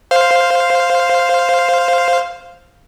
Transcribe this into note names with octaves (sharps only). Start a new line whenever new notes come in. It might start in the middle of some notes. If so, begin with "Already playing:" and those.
C5 F5